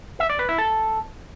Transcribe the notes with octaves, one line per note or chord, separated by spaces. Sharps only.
E5
D5
B4
E4
A4